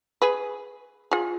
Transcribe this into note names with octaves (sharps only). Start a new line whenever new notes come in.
G#4 B4
F4 G#4